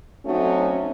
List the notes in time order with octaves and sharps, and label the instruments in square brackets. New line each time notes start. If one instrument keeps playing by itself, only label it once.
[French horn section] F#3 A3 C4 C#4 D#4 F#4